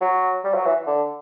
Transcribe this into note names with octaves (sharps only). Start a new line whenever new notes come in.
F#3
G3
F#3
E3
D3